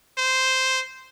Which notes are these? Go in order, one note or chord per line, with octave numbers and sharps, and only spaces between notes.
C5